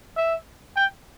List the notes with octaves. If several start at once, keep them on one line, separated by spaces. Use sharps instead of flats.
E5
G5